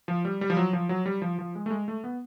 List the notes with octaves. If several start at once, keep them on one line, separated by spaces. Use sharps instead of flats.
F3
G3
G3
F3
F#3
F3
F#3
G3
F3
F3
G#3
A3
G#3
A3
B3